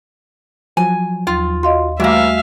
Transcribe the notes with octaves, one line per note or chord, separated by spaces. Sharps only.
F3 F#3 G#5
D#2 F4
F#4 D#5 F5 C6
E3 G3 A3 A#3 F#4 E5 F5 G#5